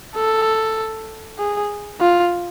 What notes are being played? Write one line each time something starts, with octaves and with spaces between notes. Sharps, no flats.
A4
G#4
F4